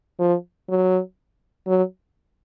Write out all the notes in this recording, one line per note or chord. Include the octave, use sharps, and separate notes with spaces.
F3
F#3
F#3